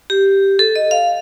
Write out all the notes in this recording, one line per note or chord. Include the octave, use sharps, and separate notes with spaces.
G4
A4
D#5
F5